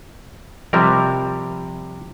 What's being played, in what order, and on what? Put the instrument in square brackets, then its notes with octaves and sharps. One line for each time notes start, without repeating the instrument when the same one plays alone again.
[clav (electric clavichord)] C3 G3 A#4 [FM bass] F3